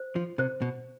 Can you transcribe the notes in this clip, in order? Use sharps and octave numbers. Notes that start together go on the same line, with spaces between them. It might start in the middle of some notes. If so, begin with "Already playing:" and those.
Already playing: C5
F3
C3 C5
B2